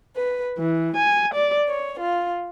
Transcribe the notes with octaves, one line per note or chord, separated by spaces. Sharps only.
B4
E3
G#5
D5
C#5
F4